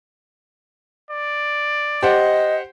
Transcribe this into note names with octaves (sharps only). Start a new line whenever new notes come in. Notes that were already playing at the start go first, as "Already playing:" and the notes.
D5
G4 C5 D#5 F#5